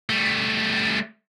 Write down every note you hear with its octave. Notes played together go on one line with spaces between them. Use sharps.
G3 A3